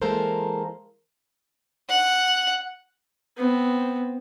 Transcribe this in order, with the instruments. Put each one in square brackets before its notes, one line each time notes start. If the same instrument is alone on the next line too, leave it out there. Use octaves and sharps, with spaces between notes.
[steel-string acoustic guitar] E3 G#3 A#3 A4 A#4 C5
[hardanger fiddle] F#5
[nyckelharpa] B3 C4